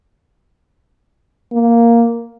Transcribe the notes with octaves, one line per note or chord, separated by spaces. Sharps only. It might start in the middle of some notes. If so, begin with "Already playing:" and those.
A#3